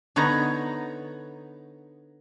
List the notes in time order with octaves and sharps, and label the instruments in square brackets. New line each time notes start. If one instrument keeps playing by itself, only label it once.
[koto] D3 B3 D#4 C#5 A#5